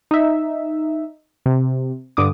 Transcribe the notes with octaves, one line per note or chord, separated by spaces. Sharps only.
D#4 E5
C3
G2 D3 D6 D#6